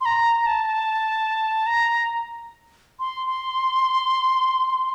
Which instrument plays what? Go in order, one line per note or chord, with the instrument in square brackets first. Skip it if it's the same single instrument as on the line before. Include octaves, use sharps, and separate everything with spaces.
[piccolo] C6
A#5
A5
A#5
C6
C6